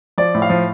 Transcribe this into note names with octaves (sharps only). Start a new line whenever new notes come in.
F3 D5
A2
F5
F3